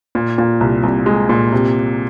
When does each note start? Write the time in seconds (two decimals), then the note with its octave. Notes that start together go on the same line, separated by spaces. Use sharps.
0.15 A#2
0.38 A#2
0.61 C2
0.83 C2
1.06 G#3
1.29 A#2
1.52 C3